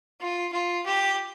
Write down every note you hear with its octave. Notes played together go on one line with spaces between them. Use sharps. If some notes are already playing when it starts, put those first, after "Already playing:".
F4
F4
G4